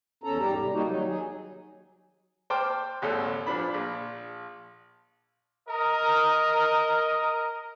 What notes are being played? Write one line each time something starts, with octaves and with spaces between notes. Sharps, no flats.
E2 C#4 A4 A#5
G#2 G3 G4 A#5
C3
G3 A#3 D#4 F#4 G4
D#2 F#3 D#4
F#3 G#4
C5 G5 A5 C6 D6 F6
G#1 D#2 A4
A#2 F3 D4 B5
A#1
A#4 D#5